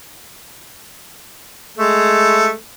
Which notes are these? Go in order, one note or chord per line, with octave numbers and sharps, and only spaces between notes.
G#3 A3